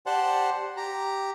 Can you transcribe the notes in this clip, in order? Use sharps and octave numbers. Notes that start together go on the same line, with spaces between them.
G4 C5 D5 F#5 A5 C6
G4 A#5